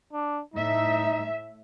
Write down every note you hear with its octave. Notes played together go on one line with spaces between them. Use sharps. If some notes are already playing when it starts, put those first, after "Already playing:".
D4
A2 D#4 E5